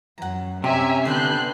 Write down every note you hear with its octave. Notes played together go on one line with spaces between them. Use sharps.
F#2 F#5 A#5
C3 C#4 G4 E5 G#5 A#5
D3 B3 B4 C5 G5 F#6 G6 C7